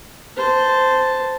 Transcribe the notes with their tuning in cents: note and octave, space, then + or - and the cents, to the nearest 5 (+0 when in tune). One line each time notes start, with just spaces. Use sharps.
C5 -10 A5 +0